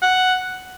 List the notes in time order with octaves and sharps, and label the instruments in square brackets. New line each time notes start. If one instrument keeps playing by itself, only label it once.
[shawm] F#5